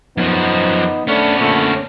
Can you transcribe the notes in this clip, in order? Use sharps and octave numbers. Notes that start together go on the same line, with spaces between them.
F#2 F3 B3 D#4
A3 B3 C#4 D4
A#2 D3 A3